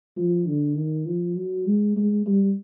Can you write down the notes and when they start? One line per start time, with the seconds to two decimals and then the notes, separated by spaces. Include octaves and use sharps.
0.16 F3
0.46 D3
0.76 D#3
1.06 F3
1.36 F#3
1.66 G#3
1.96 G#3
2.26 G3